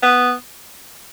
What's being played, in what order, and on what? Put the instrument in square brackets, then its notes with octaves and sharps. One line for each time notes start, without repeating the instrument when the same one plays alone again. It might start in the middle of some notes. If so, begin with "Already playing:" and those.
[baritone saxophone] B3